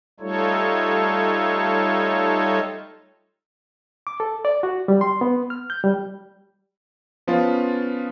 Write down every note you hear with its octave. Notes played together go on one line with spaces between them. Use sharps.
G3 A3 D#4 F4 A4 C#5
D6
A4
D5
F#4
G3
C6
B3
F6
G6
G3
F3 B3 C#4 F4